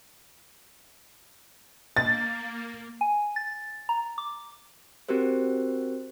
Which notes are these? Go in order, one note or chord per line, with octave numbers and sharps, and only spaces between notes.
A#3 A6
G#5
A6
A#5
D6
C4 F#4 G4 A#4 C5